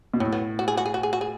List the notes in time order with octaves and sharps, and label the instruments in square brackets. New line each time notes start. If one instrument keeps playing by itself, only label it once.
[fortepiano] B2
[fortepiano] A2 [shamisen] F#3
[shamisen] B3
F#4
G#4
F#4
G#4
F#4
G#4
F#4
G#4